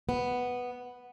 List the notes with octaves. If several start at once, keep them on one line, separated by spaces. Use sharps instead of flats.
B3